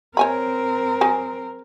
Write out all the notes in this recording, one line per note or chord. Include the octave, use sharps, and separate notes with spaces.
C4 A#4 C#5 G#5 B5
F#3 G#4 G#5